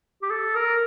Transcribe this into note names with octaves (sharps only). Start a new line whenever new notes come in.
G4
A4
A#4